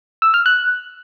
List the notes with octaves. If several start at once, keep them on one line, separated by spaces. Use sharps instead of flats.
E6
F6
F#6